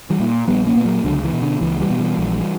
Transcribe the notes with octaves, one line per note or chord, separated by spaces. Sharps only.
E3 G3
A#2
A#1 G3 B3
A#3 C#4
A#2 B3
F#3 A#3
C#2 D3 F#3
E3
B2
D3
C#2 E3
E3 G3
B2
E3 G3
A#1